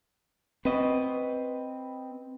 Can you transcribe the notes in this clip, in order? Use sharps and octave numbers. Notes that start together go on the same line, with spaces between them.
C4 B4 D#5